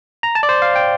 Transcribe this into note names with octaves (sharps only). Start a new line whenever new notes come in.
A#5
A5
D5
C5
F5
G5